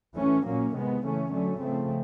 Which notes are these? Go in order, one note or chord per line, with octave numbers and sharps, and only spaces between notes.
E3 A3 C#4
A#2 F#3 A#3 C#4
C3 D#3 G#3 B3
C#3 E3 A3 C#4
D3 F#3 A3 C#4
C#3 F3 A3 C4